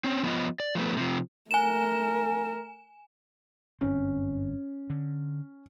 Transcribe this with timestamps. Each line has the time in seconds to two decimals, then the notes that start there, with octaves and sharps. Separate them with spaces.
0.04 C4 C#4
0.23 F3 B3 C#4 D4 F4 D#5
0.60 D5
0.75 F3 A3 B3
0.97 C3 F3
1.51 A3 A#4 G#5 E7
3.81 G1 F#2 C4 C#4
4.90 D3